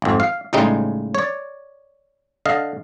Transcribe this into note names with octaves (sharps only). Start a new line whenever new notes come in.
G#1 F2
F5
C#2 A2 C#3 G3 G#3 D#4
C#5 D5
D3 D#5 F5